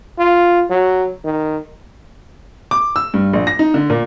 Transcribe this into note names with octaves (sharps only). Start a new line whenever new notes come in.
F4
F#3
D#3
D6
E6
G2
A#1
A#6
D#4
D3
A#2